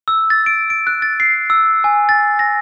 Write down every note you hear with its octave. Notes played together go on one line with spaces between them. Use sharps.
E6
A6
D7
D7
F#6
A6
C7
E6
G#5
A6
A#6